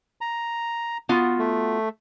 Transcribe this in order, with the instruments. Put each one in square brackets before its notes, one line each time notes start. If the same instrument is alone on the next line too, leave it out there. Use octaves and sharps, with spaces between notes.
[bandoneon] A#5
[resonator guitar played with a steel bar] B3 F4 F#4
[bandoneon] A3